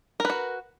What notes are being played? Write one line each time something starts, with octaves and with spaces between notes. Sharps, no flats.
F#4 A#4 B4